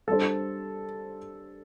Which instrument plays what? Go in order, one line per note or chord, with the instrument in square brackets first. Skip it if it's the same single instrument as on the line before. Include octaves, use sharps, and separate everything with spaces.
[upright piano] G3 D4 C5 [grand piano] A4